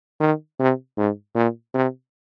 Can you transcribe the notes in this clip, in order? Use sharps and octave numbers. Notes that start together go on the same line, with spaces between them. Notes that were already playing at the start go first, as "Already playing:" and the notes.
D#3
C3
G#2
A#2
C3